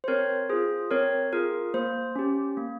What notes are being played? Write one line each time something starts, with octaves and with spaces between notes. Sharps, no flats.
C5
C4 A#4 C#5
F4 G#4 C5
C4 A#4 C#5
F4 G#4 A#4
A#3 C5
C#4 G4
A#3